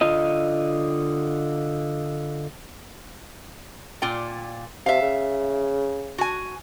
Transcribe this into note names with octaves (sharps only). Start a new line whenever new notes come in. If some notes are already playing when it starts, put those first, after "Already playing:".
D3 F4 D#5
A#2 F4 G5
C3 E5 F5
C#3
F#4 G#5